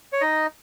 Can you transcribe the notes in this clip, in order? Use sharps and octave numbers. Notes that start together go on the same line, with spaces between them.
C#5
D#4 D#5